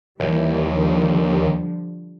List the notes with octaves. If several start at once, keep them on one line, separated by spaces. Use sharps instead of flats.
D#2 E3 G3 E4
D3 F3 G3